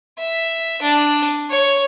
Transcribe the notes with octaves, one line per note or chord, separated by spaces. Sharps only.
E5
D4
C#5